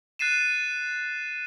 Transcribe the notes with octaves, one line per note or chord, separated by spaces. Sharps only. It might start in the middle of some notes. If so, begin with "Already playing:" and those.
F#6 A6 C7 D#7 E7